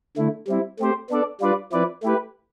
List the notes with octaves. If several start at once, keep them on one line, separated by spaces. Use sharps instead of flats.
D3 A3 E4
G3 C4 E4
A3 C4 G4 C5
B3 D4 A4 D5
G3 D4 F4 B4 D5
F3 C4 E4 B4 D5
A3 E4 G4 B4